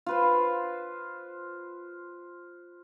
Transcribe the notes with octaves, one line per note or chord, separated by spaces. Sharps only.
F4 B4 C5